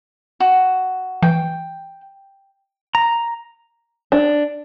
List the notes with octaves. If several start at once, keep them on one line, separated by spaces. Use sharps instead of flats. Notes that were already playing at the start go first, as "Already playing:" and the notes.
F#4
E3 G5
A#5
D4